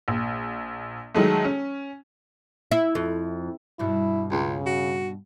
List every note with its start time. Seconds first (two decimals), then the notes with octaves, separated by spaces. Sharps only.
0.08 A#1
1.15 D#3 F#3 G#3 A3
1.44 C#4
2.72 E4
2.95 F2
3.79 G2 B2 E4
4.31 C#2 C#3
4.66 F#4